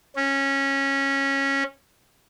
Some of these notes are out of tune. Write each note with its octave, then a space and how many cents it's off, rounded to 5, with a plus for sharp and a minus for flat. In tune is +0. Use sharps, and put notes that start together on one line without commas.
C#4 -15